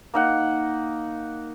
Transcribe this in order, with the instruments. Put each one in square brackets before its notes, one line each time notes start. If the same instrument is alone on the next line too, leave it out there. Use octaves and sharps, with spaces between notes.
[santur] A#3 D#4 F#5